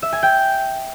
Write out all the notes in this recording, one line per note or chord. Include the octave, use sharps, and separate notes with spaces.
E5
G#5
G5